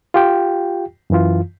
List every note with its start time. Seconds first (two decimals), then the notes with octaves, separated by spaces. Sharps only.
0.14 F4 G4 G5
1.10 F#2 E3 F4